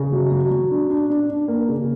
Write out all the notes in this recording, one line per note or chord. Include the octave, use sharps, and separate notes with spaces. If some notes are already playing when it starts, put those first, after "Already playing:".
Already playing: C#3
F#3
F#3
F#3
D4
D4
D4
D4
A#3
C#3